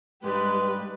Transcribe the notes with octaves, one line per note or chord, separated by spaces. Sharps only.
G#2 G3 G#3 G4 B4